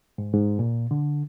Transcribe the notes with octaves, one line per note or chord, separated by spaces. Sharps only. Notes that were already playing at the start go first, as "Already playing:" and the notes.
G#2
G#2
A#2
D3